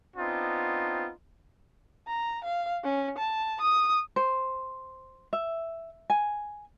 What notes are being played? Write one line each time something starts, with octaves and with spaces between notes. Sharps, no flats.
B3 C4 D4 D#4 F4
A#5
F5
C#4
A5
D#6
C5
E5
G#5